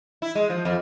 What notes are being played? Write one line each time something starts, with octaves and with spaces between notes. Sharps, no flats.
E4
G#3
F3
F2